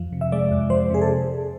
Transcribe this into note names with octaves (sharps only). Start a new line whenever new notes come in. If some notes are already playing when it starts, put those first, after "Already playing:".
Already playing: F2 F3
C3
E5
G#3 D5
F2
F3 C5
C3 G#4
A4